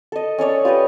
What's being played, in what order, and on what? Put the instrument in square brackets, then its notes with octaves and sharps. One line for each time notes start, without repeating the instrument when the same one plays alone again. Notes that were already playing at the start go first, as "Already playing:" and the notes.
[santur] A4 D#5
C#4 A4 C#5 D5
F4 G4 B4 D#5